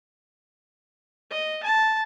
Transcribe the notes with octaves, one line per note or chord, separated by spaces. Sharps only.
D#5
A5